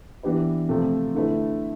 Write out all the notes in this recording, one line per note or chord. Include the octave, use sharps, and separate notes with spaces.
E3 B3 D4 G4 B4
C3 F3 A3
D3 A3 E4 B4